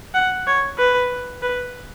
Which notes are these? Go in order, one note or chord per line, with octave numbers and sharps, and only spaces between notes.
F#5
C#5
B4
B4